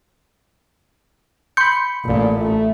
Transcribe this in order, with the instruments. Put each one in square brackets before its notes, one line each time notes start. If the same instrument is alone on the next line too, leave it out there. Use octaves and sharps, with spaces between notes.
[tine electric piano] B5 C#7 [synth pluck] C6 G6
[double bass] A1 [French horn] A#2
[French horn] A3